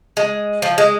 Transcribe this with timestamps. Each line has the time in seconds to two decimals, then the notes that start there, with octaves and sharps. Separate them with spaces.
0.17 G#3
0.62 F3
0.78 G#3